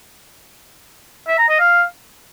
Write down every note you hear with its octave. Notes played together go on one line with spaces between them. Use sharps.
E5
A#5
D#5
F5